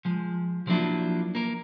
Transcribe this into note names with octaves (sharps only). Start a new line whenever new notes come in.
F3 G#3
F3 F#3 A#3 D4 E4 F4
A#3 A#4